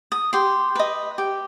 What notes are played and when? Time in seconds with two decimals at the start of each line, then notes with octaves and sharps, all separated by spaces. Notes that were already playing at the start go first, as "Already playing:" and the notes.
0.12 D#6
0.33 G4 C6
0.75 B4 D#5
1.18 G4